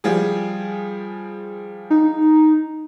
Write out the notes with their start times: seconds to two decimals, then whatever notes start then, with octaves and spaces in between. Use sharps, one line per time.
0.04 F3 G3 G#4
1.90 D#4